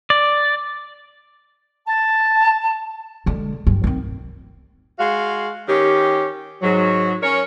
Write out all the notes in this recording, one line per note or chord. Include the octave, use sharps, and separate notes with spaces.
D5
A5
D3 G#3
G2
D#3 C4
G#3 F#4 F5
D#3 C#4 G4
G#2 F#3
C#4 A#4 C#5